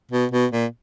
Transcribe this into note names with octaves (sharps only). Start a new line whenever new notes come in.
B2
B2
A#2